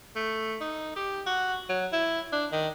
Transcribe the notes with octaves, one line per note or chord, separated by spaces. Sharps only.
A3
D#4
G4
F#4
F#3
E4
D4
D#3